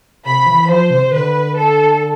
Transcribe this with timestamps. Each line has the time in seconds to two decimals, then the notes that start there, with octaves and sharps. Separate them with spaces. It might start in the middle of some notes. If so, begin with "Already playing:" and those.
0.25 C3 B5
0.46 E3
0.69 F3 C5
0.90 C3
1.12 D3 B4
1.57 A4